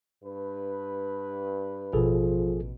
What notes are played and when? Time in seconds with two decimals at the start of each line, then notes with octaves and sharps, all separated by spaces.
0.23 G2 B4
1.93 A1 B2 F3 G#4 A4